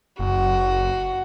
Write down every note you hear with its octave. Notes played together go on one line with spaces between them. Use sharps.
F#1 F#4